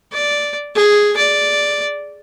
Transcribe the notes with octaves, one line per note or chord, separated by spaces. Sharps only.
D5
G#4
D5